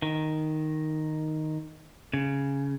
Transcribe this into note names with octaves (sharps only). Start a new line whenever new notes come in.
D#3
C#3